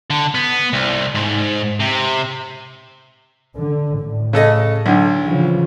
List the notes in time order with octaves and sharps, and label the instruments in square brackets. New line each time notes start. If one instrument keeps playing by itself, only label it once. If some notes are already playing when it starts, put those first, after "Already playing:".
[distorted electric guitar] D3
B3
C2
G#2
C3
[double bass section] D3
A2
[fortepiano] C#3 A4 D#5
B1 D3
[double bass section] C#3 E3 F3